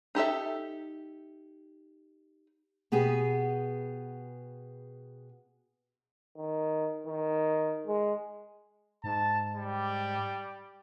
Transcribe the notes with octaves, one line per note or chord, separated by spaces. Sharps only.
D#4 G4 A4 E5
B2 B3 G4 G#4
D#3
D#3
G#3
G#2 A5
G3